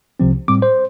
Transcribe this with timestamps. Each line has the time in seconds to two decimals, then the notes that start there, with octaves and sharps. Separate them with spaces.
0.20 C2 C3 F3 C4
0.48 A2 G3 C4 D6
0.62 C5